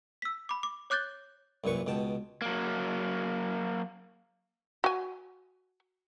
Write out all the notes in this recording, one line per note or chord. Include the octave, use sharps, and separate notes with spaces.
E6 B6
B5 D6
D6
C#5 D6 F#6 G6 A6 G7
C2 F#2 A#2 B4 C#6
C#2 B2 G5 A5
F#3 A#3
F#4 G#5